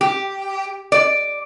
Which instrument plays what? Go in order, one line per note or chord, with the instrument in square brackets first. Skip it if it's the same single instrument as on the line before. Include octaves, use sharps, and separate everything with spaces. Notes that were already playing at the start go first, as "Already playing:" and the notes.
[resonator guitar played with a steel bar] G4
D5